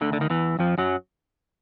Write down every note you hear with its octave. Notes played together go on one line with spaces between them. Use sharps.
D2 D3
D3
D#3
E2 E3
F2 F3
F#2 F#3